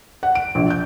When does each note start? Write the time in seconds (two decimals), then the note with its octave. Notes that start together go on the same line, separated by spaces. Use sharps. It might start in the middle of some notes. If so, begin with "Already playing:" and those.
0.23 F#5
0.35 D7
0.55 A#1
0.70 G6